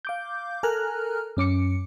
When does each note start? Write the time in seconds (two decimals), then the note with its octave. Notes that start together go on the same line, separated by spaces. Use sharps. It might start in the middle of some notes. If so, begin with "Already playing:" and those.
0.05 F5 D6 G6
0.63 A4 A#4 G#5 A#5 F6 F#6
1.37 F#2 C#4 D6 C#7